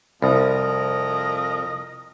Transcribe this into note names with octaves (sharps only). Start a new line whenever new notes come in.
C2 F2 A#4 D#5